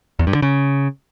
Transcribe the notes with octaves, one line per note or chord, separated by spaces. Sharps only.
E2
G2
D3
C#3